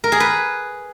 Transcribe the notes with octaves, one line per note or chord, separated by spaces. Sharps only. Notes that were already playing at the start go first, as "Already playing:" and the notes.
A#4
G#4
B4